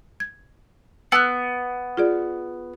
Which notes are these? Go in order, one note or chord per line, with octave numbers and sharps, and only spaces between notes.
G#6
B3 E6 F#6
F4 G#4 D5